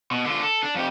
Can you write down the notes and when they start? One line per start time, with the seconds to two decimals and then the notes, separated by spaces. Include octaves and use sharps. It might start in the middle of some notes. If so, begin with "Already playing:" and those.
0.11 B2
0.25 D3 F4
0.43 A4
0.63 D4
0.75 F2 G4